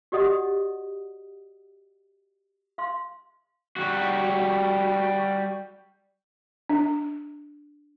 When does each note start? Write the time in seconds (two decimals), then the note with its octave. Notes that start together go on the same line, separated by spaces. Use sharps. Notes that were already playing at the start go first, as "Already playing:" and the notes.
0.12 F#4 G4 D5 D#5 F#5 D#6
2.78 F5 C6
3.76 G3 F#4
6.69 D4